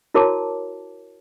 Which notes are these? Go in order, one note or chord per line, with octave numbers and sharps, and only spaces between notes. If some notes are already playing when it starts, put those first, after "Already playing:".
E4 F#4 A#4 C#5 A5 D6